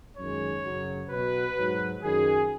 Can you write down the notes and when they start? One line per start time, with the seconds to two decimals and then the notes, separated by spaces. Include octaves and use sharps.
0.17 F#2 D#3 G#3 C#5
0.64 F#2 C#3 F#3
1.09 B2 F#3 B4
1.57 G#2 F#3
2.03 F#2 D#3 F#3 G#4